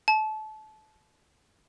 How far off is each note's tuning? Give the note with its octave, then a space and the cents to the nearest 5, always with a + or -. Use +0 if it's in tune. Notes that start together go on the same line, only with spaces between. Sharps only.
A5 -30